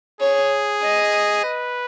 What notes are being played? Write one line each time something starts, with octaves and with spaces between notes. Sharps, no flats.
G#4 C#5
D#5
B4